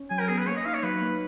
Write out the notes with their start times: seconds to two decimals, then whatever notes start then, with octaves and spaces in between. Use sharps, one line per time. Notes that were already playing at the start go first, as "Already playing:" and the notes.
Already playing: C#4
0.10 F#3 G#5
0.20 A#4
0.28 B3 G#4
0.38 B4
0.47 A#3 C#5
0.57 D#5
0.66 D#4 F5
0.74 C#5
0.83 F#3 B4
1.01 A#3